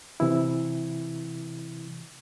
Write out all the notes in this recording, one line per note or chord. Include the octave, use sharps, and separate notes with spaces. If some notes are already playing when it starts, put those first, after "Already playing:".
C3 E3 E4